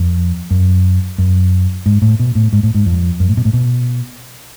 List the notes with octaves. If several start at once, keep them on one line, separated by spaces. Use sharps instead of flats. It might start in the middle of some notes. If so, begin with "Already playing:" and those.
Already playing: F2
F#2
F#2
G#2
A2
B2
A2
G#2
A2
G#2
F2
F#2
A2
B2
A2
B2